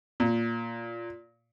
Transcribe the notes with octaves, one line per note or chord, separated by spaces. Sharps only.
A#2